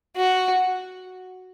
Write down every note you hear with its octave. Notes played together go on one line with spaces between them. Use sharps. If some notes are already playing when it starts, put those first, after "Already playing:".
F#4